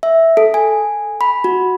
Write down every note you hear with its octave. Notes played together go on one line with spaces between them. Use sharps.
E5
A4
G#5
B5
F#4